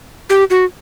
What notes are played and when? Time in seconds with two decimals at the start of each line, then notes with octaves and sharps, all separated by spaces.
0.30 G4
0.50 F#4